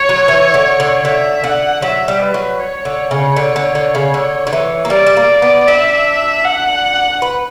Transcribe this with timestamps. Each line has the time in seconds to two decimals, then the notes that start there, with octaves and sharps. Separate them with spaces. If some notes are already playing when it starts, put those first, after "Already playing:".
Already playing: C#5
0.09 F#3
0.28 E3
0.54 D3
0.80 D3
1.05 D3 E5
1.44 D3 F#5
1.82 F#3 E5
2.08 G3
2.21 B4
2.34 F#3
2.59 C#5
2.85 D3
3.11 C#3
3.37 D3
3.56 D3
3.75 D3
3.95 C#3
4.14 D3
4.47 D3
4.53 E3
4.85 A#3
4.90 G3 D5
5.07 G3
5.17 A#3
5.42 B3
5.67 D4 E5
6.45 F#5
7.22 B4